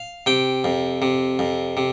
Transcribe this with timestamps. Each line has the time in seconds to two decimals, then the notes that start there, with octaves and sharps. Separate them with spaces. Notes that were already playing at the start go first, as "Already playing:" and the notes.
Already playing: F5
0.26 C3 G5
0.64 F2
1.02 C3
1.39 F2
1.77 C3